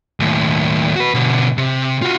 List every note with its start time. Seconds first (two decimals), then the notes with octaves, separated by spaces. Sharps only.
0.20 D#2 A2
0.96 F#4 B4
1.14 B2 D3
1.58 C3
2.02 F4 F#4